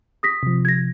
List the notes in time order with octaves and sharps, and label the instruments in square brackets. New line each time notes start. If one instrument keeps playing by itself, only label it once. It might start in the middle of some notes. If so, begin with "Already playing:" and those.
[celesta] D#6 A#6 B6
[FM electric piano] C3 F3
[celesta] G#6 A#6